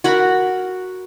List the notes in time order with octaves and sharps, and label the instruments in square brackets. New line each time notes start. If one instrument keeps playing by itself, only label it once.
[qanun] F#4 A#4 B5